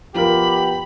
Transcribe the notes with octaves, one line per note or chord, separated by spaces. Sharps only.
B2 F3 F4 G4 A#4 B5